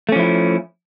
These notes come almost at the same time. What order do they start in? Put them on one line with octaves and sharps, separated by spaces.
A3 C#4 F3 E4